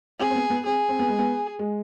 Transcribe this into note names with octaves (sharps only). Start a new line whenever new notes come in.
C4 G#4
C4
B3
B3
C4 G#4
C4
B3
G#3
B3
G#3